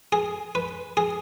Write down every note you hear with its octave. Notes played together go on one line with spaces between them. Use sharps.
G#4
B4
G#4